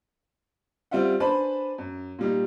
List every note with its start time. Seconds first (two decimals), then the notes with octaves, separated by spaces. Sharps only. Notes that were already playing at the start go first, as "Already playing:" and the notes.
0.91 G3 C4 F4 E5 F#5
1.20 D4 B4 C5 G#5 A5 B5
1.78 F#2
2.19 A#2 G3 D#4